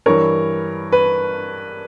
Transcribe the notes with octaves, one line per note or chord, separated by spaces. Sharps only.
G2 E3 A#4 C#5
B4